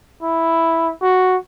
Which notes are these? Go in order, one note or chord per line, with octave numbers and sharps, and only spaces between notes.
E4
F#4